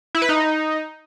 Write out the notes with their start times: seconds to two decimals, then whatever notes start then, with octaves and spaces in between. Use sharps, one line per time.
0.15 E4
0.22 B4
0.29 D#4